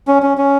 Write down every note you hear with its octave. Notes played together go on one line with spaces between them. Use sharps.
C#4
C#4
C#4